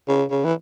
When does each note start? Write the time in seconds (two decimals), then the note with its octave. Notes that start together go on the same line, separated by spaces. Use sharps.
0.08 C#3
0.30 C#3
0.44 E3